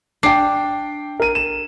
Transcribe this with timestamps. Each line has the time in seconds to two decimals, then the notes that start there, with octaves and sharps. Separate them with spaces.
0.23 D4 G5 C7
1.20 A#4 D#7
1.35 E7